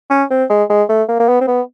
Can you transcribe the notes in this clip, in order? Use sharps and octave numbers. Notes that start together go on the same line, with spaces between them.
C#4
C4
G#3
G#3
A3
A#3
A#3
B3
C4
B3